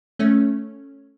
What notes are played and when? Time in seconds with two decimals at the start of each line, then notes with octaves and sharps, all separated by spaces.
0.19 A3 C#4